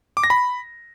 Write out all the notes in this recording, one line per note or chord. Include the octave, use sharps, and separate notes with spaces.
D6
A#6
B5